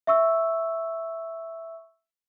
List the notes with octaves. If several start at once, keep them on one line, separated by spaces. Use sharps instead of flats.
E5 C#6 E6